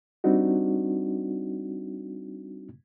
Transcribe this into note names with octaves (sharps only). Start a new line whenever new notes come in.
G3 C4 D4 D#4 F#4